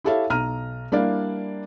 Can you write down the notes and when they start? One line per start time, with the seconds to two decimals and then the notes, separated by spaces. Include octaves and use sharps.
0.04 E4 G4 A4 C#5 E5 F5
0.30 B1 A#5 F6 D#7
0.92 G3 A#3 D4 E4 D5 F5